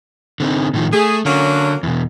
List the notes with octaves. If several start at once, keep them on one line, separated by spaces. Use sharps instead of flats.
D3 C4 D#4
A2 D#3 F3
A3 G#4
D3 F#3 A#3 C#4
E2 B2